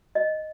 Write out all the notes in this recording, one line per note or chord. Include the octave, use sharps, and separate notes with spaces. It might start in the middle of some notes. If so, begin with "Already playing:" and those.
D#5